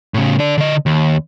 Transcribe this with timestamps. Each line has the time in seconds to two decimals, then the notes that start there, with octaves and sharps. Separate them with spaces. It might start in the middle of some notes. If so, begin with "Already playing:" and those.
0.14 A2 C#3
0.39 D3 D5
0.58 D3 D#5
0.86 D#2